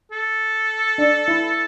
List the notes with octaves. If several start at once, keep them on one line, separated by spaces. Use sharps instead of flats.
A4
D4
E4